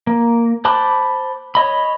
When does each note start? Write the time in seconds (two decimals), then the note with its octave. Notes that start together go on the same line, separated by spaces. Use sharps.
0.07 A#3
0.65 C5 A5 B5 D6 F#6
1.55 C#5 D#5 B5